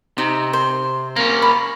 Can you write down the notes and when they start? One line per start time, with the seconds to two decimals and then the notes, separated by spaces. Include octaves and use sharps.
0.18 C3 D#4
0.53 C5
1.16 A#3 C#4 A#4
1.42 B5